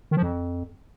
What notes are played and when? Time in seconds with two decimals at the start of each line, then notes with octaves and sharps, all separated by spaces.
0.11 D#3
0.17 F3
0.22 F2